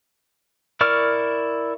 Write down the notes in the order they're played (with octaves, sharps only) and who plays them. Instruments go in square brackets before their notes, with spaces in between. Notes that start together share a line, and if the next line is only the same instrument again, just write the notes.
[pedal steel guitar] E4 A#4 D5 C#6 F6